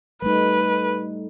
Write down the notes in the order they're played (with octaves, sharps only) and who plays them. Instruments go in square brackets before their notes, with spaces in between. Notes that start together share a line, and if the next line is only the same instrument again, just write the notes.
[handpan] G3 A3 D#4 [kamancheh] B4